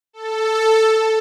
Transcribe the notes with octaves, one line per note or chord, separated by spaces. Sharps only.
A4